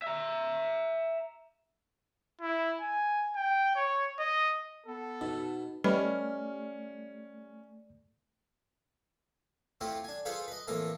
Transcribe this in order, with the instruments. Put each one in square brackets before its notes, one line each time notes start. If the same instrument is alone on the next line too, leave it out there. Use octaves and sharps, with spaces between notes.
[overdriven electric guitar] E5 A#5
[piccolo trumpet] E4
G#5
G5
C#5
D#5
[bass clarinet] B3 [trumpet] A4
[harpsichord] B2 [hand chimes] D#4
[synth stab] G3 [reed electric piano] A3 D5 F6 [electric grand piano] C#4 [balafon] B4 D#5 B5
[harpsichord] A3 C4 E4 F4 G4
D4 G#5
F4 G#4 A4 B4 C5 F5
B4 D#5
F2 A2 E3 A#3 E5 A5